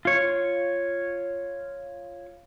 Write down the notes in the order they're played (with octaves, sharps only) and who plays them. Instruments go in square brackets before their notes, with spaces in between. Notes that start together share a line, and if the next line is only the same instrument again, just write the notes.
[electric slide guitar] F4 C#5